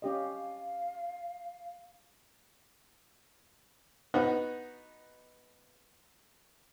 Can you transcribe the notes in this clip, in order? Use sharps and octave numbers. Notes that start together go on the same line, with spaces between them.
C#4 G4 D#5 F5
B3 D#4 F#4